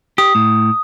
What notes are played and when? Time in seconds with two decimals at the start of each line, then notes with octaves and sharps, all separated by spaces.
0.18 G4 D#6
0.35 A2